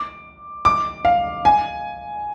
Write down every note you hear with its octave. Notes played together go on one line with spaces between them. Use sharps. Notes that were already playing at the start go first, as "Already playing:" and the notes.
Already playing: D6
D6
F5
G#5